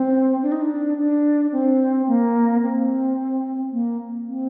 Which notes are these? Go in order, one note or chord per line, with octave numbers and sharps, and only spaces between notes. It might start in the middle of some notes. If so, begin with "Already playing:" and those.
Already playing: C4
D4
D#4
D4
D4
C4
A#3
C4
A#3
C4